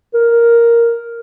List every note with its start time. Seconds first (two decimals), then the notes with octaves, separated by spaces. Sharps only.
0.14 A#4